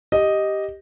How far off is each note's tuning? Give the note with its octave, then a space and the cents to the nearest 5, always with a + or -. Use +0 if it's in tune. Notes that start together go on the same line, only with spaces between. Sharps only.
G4 +0 D#5 +0